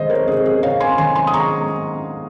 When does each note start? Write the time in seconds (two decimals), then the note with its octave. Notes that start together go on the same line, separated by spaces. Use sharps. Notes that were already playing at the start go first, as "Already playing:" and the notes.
Already playing: C3 D#3 G#3 C5 D#5
0.10 A#4 C#5
0.28 C3 G#4
0.46 G#4
0.63 C3 C#5 F5
0.80 G#5 C6
0.98 D#3 G#5 C6
1.15 G#5 C6
1.27 D#6
1.33 G#3 A#5 C#6